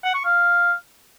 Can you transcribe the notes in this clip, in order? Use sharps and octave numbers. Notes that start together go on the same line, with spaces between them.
F#5
C#6
F5